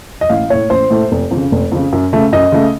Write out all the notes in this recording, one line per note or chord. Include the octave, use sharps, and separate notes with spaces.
D#5
A1 F5
A2 A3 C#5
A1 C5
A2 A3
F1
F2
C#3
F1
F2 C#3
F#2
C#3 A3
F#2 D#5
C#3 A3